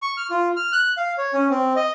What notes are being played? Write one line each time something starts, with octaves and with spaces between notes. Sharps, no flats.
C#6
F6
F4
F6
F#6
F5
C#5
C#4
C4
D#5